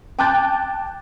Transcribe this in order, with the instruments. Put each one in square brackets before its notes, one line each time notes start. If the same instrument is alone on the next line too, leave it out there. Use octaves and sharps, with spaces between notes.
[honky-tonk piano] G5 A5 D6 F#6 G6 A6